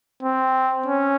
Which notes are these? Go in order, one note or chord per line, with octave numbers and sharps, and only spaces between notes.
C4
C#4